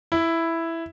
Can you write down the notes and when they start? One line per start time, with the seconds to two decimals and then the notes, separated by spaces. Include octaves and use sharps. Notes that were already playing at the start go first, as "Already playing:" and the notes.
0.12 E4